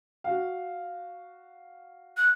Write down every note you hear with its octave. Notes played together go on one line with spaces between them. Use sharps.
F#4 F5
F#6